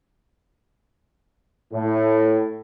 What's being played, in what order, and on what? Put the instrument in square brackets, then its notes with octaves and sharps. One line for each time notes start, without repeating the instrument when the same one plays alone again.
[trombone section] A2